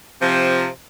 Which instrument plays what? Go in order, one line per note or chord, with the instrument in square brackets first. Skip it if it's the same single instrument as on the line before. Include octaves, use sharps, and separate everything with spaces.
[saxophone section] C3 F3